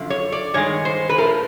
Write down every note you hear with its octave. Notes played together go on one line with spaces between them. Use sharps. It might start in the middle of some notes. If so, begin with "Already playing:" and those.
Already playing: F#2 D3 F3
C#5
D5
G2 D#3 G#3 C#5
C5
B4
A#2 F3 A3 A#4